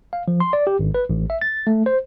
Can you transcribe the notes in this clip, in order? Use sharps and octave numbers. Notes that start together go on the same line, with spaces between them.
F5
F3
C6
D5
G4
G#1
B4
A1
E5
A6
A3
C5